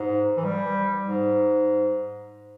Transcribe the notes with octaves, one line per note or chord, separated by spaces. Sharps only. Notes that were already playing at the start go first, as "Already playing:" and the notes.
Already playing: G#2
E3
G3
G#2